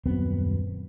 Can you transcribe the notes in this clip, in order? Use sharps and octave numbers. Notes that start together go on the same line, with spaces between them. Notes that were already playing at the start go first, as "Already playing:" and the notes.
D#1 F#2 B3 C4